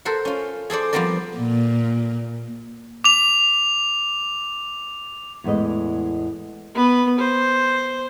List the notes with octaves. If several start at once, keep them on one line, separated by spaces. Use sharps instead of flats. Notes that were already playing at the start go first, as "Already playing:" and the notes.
A4 A#4 C5 F#5
C#4 F4
G#4 A4 C5 D5
F3 G3 B3 C4 A#4 D5
A#2
D6 F7
E2 A2 G#3 B4 D#5
B3 B4
C5